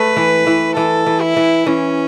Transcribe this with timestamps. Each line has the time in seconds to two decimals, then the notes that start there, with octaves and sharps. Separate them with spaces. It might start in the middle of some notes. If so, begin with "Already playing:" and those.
Already playing: A3 B4
0.16 E3
0.47 E3
0.77 E3 A4
1.06 E3
1.21 E4
1.36 E3
1.66 E3 C#4